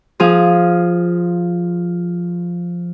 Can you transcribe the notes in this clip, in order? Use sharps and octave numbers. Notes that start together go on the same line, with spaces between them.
F3 G#4 F5